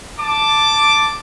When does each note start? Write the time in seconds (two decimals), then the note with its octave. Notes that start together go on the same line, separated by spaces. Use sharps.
0.18 A5 D6